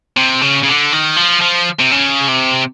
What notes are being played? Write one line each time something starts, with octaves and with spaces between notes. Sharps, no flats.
C3
C#3
C#3
D3
D#3
F3
F3
C3
C#3
C3